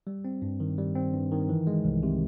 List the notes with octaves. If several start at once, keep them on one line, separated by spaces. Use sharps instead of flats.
G3
C4
G2
D#3
G3
C4
G2
D#3
E3
G#3
C2
C3